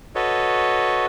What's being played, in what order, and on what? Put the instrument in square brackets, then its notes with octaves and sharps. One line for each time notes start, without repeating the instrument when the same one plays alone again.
[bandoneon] F#4 A4 B4 C#5 D#5